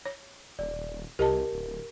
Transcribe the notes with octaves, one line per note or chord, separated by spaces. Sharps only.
C#5
D#1 D5
C2 G4 A#4 D#5 A5
D1